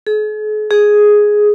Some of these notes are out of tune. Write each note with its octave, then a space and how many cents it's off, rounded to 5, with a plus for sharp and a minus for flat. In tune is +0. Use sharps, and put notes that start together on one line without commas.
G#4 +45
G#4 +5